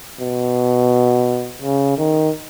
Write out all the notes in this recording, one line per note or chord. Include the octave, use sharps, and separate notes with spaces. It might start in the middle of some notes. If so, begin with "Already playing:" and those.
B2
C#3
D#3